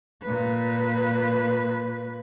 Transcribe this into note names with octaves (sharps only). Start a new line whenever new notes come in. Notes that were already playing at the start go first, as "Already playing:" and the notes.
A#2 B4